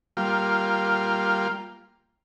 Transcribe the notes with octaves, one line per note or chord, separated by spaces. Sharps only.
G3 A#3 F4